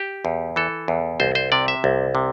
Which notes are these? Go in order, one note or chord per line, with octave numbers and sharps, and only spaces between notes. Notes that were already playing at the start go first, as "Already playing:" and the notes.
Already playing: G4
E2
E3 A4
E2
C2 C5
C5
C3 D5
E5
C2
C3